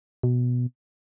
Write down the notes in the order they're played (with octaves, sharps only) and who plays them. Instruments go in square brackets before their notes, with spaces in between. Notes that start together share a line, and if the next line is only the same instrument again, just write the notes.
[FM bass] B2